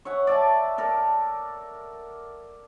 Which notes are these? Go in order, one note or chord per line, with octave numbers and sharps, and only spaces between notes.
C#5 E5 F#5
D5 E5 A5
A4 A#4 D5